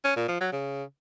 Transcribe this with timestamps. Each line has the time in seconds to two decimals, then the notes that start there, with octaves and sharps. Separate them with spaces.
0.05 C#4
0.16 A#2
0.28 F3
0.40 F#3
0.52 C#3